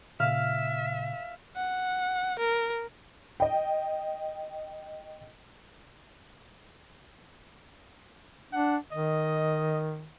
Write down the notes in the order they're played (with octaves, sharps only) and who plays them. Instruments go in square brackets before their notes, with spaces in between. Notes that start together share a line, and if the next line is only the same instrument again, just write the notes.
[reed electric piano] A#2 C#3 [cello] E5 [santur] F5
[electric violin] F#5
A#4
[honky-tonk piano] D#5 G5
[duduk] D4 [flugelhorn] F#5
[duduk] D#3 [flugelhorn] D#5